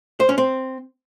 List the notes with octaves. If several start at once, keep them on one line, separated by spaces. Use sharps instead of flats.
C5
C#4
C4